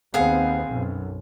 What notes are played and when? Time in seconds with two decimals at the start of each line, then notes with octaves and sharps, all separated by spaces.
0.14 D#2 B3 C4 G#4 F5 F#5
0.69 B1 F#2